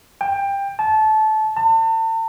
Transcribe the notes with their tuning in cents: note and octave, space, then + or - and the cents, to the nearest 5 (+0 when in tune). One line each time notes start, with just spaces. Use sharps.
G5 +20
A5 -20
A5 +40